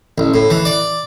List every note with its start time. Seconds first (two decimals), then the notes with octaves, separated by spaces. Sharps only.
0.18 A1
0.34 A2
0.50 E3
0.65 D5